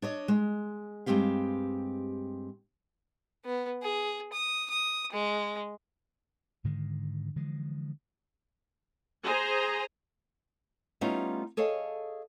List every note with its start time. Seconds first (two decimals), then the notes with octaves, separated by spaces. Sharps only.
0.02 D4 C#5 D#5
0.28 G#3
1.06 G2 E3 G#3 C4 G4 F5
3.45 B3
3.83 G#4
4.33 D#6
4.70 D#6
5.12 G#3
6.64 G#2 D3 D#3 G#3
7.36 D3 E3 F3 G#3
9.24 G#4 C5 G#5 A#5
11.01 G3 A3 B3 C#4 D#4 F4
11.57 G#4 A4 C#5 D#5 F5